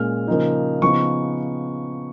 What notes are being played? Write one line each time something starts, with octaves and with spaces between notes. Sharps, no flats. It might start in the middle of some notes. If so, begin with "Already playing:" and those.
Already playing: A#2 G#3 C#4 F6
C#3 F3 A#3 D#4
C#3 F3 B3 D#4 C#6